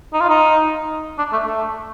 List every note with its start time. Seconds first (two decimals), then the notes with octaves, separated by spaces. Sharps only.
0.13 D#4
0.21 F4
0.29 D#4
1.18 D4
1.32 A3
1.46 A3